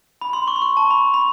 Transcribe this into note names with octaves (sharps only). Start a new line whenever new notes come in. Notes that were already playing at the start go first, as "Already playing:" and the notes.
B5
C6
C#6
C6
C#6
A5
B5
B5